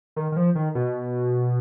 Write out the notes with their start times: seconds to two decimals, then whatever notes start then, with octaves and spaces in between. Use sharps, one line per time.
0.16 D#3
0.32 D#3
0.37 F3
0.55 D#3
0.75 B2